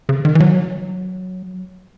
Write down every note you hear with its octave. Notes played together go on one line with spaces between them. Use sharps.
C#3
D#3
E3
F#3